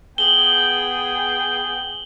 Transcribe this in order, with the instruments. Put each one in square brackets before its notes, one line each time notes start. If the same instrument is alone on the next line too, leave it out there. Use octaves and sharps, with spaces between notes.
[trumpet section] B3 G#4 G5 [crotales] F#7 G7